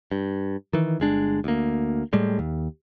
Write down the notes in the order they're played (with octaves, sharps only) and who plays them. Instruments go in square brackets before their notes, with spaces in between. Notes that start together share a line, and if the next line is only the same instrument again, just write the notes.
[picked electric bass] G2
D#3 E3
G1 G#3 D4
D2 A#3
A2 G3 G#3
D#2